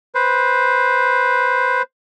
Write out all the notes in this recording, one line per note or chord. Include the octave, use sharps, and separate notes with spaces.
B4 C5